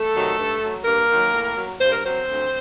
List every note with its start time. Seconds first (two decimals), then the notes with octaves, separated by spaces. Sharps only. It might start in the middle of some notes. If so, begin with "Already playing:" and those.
Already playing: A3 A4
0.14 C3 D#3 F#3
0.37 G2
0.62 F#3
0.84 G2 A#3 A#4
1.09 D#3 F#3
1.32 A2
1.56 F#3
1.80 G2 C5
1.92 A#4
2.03 F#3 C4 C5
2.27 D2